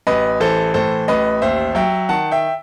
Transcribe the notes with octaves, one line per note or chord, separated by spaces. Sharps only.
A1 B4 D#5
E3 A4 C5
A2 A4 C5
A1 B4 D#5
D#2 C5 E5
F#3 E5 G5
D#3 F#5 A5
E5 G5